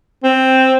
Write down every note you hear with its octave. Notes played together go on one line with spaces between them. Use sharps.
C4